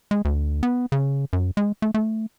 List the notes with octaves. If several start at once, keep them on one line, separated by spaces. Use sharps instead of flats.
G#3
D2
B3
C#3
F#2
G#3
A3
A3